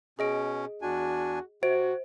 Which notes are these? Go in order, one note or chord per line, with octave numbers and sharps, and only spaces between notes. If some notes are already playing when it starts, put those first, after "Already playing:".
B2 C#4 G#4 D#5 D7
E2 D4 F#4 G#5
C3 F#4 C5 D7